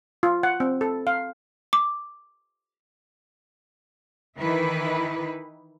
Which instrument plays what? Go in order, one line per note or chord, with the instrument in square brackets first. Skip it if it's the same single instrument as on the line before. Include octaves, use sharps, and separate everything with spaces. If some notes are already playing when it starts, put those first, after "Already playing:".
[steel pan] F4
F#5
C4
A4
F5
[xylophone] D6
[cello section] D#3 E3 D#4 E4 B4